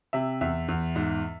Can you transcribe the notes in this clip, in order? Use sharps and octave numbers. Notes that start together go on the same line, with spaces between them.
C3 E5
E2 E5
E2
G#2